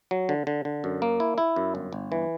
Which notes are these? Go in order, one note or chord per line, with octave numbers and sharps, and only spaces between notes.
F#3
D3
D3
D3
F#2
A#3
E4
E4
F#2
G1
G1
E3